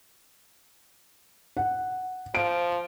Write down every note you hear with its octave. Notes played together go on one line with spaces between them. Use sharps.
F#5
F3 D7